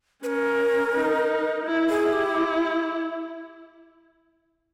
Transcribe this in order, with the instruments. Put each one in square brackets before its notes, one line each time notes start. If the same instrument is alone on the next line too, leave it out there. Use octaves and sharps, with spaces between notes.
[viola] C#4 [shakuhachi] B4
[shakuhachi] A#4
[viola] D#4
E4
[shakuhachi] G#4
[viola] E4
[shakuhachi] G4